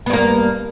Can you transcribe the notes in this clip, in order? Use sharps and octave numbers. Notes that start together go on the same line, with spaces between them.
G2 A#3 B3